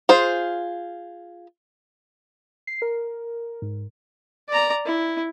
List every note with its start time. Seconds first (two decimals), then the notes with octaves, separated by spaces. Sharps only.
0.09 F4 G#4 C5
2.67 C7
2.82 A#4
3.62 G#2
4.49 D5 A#5
4.86 E4